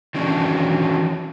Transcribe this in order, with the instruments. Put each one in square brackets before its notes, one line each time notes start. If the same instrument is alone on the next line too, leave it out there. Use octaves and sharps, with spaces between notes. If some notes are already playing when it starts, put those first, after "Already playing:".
[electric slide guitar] D#3 E3 F#3 C#4 D4